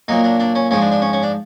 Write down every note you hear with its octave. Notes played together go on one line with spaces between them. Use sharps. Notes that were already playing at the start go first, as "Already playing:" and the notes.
A#2 F#3 A#3 D#4
D4
D4
C#4
G#2 F3 G#3 C#4
D4
D4
C#4
C#4
D4